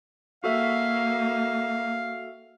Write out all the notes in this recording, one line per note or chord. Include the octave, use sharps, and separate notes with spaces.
A#3 F#4 A4 E5 F5